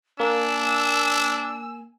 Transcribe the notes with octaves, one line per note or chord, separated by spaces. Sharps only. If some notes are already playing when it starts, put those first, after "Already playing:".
A#3 D4 G#5 E6